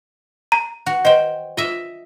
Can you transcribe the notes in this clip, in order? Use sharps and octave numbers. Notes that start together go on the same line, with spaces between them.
A#5
F#4
C5 D#5 G5
F4 D#5 E5